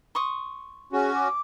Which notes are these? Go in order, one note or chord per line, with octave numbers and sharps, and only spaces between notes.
C6 C#6 D#6
C#4 F#4 G#4
D6